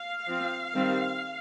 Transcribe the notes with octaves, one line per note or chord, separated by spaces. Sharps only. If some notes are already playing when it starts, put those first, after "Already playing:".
Already playing: F5
F3 C4
D#3 G3 C4